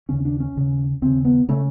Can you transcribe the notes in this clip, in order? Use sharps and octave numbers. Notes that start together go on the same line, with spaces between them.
D#2 C#3 C#4
D4
C#4
D#2 C#3
D#2 C#3 C4
B3
C#3 A3